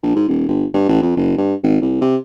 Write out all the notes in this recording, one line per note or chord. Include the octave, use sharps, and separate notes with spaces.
A#1
G#2
D#1
G1
G2
A1
F2
F#1
G2
G#1
C2
C3